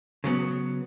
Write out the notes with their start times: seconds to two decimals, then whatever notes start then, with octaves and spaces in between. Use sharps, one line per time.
0.24 C#3 F#3 B3